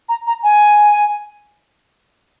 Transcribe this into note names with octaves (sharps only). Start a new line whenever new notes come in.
A#5
A#5
G#5